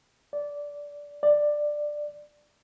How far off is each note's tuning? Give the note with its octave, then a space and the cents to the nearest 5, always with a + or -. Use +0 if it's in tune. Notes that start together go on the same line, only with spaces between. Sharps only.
D5 -15
D5 +10